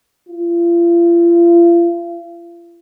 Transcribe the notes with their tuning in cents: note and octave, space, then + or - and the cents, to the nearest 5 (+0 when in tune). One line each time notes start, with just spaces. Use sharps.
F4 -40